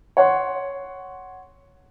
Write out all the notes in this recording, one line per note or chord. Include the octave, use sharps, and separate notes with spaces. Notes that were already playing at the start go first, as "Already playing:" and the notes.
C#5 F#5 C6